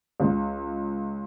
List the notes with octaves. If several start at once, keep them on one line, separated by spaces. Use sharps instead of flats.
C#2